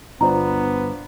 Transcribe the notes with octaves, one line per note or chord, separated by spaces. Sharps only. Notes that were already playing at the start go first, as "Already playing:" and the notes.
G1 B3 D4 F4 C5 A#5